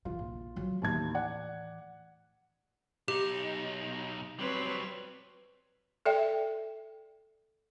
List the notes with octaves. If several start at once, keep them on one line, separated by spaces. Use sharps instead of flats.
E1 E3 F4
A#1
F3 F#3
D#2 A2 E3 A5 G#6
D5 F#5
B1 D#4 G4
F#3 G3 C4 B4 C#5
A4 D5 E5 G5